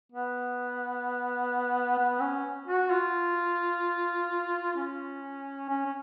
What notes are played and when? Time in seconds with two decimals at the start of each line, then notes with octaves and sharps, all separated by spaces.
0.12 B3
1.98 B3
2.21 C#4
2.68 F#4
2.91 F4
4.77 C#4
5.69 C#4
5.86 C#4